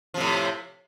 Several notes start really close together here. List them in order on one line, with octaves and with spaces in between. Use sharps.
F3 C3 A2